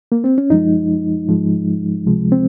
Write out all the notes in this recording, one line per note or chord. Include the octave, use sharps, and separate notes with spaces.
A#3
C4
C#4
F#2 F3 G#3 D#4
G#2 F3 G#3
C#2 C3 F3 G#3
C4